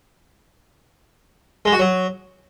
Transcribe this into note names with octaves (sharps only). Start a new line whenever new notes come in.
G#3
F#4
F#3